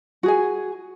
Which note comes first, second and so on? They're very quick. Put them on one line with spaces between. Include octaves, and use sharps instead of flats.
F#4 G#4 G#5